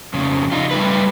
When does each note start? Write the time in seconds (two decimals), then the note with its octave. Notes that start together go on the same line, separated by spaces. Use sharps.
0.14 F2 C#3
0.52 D#4 F4
0.71 G3 A3 B4